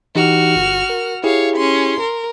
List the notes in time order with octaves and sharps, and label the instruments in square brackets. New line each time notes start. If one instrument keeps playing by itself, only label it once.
[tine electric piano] E3 D#4 G4 [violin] F#4 F6
[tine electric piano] G1
A#4
[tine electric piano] E4 G4 G#4 [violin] C#5 F5
[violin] C#4 C6
A#4